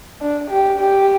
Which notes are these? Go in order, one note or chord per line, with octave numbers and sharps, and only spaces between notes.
D4
G4
G4